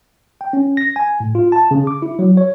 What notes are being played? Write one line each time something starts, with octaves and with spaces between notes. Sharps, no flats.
G5
C#4
A#6
G#5
A2
F4
A5
C#3
D6
E4
F#3
C#5